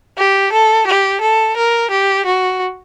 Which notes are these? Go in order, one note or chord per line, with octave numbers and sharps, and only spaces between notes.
G4
A4
G4
A4
A#4
G4
F#4